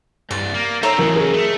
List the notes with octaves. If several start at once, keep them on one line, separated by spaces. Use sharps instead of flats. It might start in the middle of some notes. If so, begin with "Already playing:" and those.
C2 G2 D5
A#3
C4 D#4 A4 C#5 E5
A1 C#3 F#3 A#4 F#7
G#4 A#4
A3